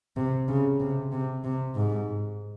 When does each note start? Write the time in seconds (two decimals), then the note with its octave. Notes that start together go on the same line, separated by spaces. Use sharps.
0.17 C3
0.48 C#3
0.80 C3
1.12 C3
1.44 C3
1.75 G#2